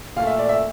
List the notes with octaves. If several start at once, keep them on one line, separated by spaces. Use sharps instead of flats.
A#2 A3 F5
E5
D5
E5